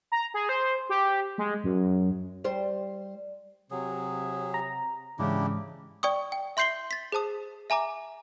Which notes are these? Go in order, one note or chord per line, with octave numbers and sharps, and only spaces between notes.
A#5
G#4
C5
G4
G#3
F#2
G3 C5
C3 F#3 G#4
A#5
G#2 C#3 E3 G#3 D4 E4 G4
D5 G5 C#6 D#6
G5
E5 C6 G6 C7 F#7 G7
A6 B6
G#4 C5 A5 D#6
E5 G#5 A#5 D6